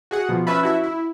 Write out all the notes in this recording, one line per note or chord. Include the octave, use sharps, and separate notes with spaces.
F#4 G#4 F#5
B2 F3
C#4 B4 E5 A5 B5
E4 F#4 E5
E4